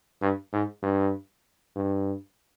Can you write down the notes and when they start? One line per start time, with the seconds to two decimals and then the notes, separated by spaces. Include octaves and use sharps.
0.22 G2
0.53 G#2
0.83 G2
1.76 G2